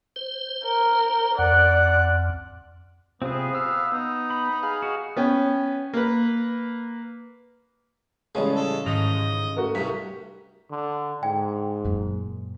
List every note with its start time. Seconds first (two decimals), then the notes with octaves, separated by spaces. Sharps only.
0.16 C5
0.64 A#4
1.38 F2 D5 F#5 F#6
3.22 C3 B3 C4 F4 G#4
3.55 F5 E6
3.92 B3 D#4
4.30 B5
4.63 G#4 F5
4.82 F#4 D#5
5.17 B3 C#4 G5
5.94 A#3 B4
8.35 A1 C#3 G3 G#3 C#5 A5 D#6
8.56 A4
8.86 G#2 D#3 D#5 F7
9.57 A3 F#4 A#4
9.75 C2 G2 B6
10.70 D3
11.23 G#2 G5
11.85 F#2 A#2